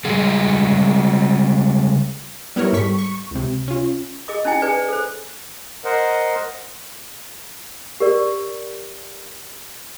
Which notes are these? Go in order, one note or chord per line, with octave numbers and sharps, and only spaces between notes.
C#3 G3 G#3 G#4
G3 B3 E4 A#4 C#5
G#2 G3 A4 C#6 B6
C#6
C#2 C3
C#4 F4
G#4 D#5 D6
C#4 D#4 E4 G#5
G#4 B4 D5 G#5
A4 C5
A#4 C5 D#5 F#5
G4 A#4 D5